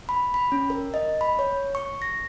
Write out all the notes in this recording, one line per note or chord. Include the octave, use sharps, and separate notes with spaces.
B5
B5
C#4
A#4
D#5
B5
C#5
C#6
A#6